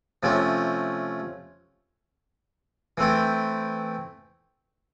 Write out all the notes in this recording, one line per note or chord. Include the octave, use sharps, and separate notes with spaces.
C3 F3 A3 C#4
E3 A3 C4